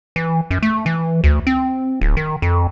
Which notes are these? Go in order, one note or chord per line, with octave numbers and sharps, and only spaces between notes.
E3
F#2
A3
E3
D2
C4
D1
D#3
F2